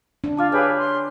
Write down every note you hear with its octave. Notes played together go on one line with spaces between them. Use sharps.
D4
F4 A5 D6 F6
G4 G#4 B4 C#5 F6
C6